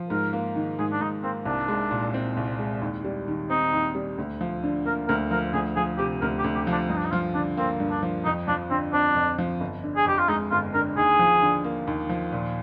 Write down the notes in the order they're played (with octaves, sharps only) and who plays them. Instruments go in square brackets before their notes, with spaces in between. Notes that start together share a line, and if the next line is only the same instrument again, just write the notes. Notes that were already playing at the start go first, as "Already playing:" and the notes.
Already playing: [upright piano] F3
[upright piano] G#2 [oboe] A#4
[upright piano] A#3
D#3
[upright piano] G#2 [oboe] G#4
[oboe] D4
[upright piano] G#2 [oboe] D#4
[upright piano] A#3 [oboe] C4
[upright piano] C2 [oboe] D4
[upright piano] G#3
A#2
C4
C2
G#3
D#2
G3
D#3
[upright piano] C4 [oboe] D#4
[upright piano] D#2
G3
D2
F3
D3
[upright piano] A#3 [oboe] A#4
[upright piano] D2 [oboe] A#4
[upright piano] F3 [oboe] A#4
[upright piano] D2 [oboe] G#4
[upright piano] F3 [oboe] G#4
[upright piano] C3 [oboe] G4
[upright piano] D2 [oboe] A#4
[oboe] G4
[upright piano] D2
[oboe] G4
[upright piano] F3 [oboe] D4
[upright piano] G2 [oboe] D#4
[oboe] D4
D#4
[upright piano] F3 [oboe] F4
[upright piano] D3 [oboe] D4
[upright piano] A#3 [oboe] C4
[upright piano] G2
[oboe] D4
[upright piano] F3
[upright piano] F2 [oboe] D#4
[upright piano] F3 [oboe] D4
[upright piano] D3 [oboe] C4
[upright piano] C4 [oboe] D4
[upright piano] F2
F3
G1
D3
[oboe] G#4
[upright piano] F2 [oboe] G4
[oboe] F4
[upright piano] G#3 [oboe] D#4
[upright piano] G1 [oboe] F4
[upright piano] D3 [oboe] A#4
[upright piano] D#2 [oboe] G#4
[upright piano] F3
D3
A#3
D#2
F3
A#2